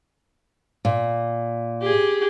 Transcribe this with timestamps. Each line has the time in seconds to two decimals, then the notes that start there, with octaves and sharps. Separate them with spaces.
0.85 A#2
1.82 G4 G#4